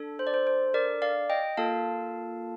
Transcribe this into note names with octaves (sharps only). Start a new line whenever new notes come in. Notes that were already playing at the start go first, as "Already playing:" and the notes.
Already playing: D4 A4
C5
D5
C5
C5
A#4 D5
D5 F5
D#5 G5
A#3 F4 A4 F5 A5